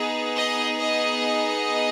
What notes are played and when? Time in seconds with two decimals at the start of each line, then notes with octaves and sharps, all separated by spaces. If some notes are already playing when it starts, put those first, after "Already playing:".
Already playing: B3 D#4 G#4
0.35 D#5
0.79 D#5